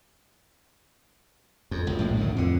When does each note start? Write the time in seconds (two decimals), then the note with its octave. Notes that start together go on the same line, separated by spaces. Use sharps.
1.71 F2
1.87 C#2 F#2
1.99 A#1 A2 G#3
2.17 D2 A2 D#3
2.37 F2 D3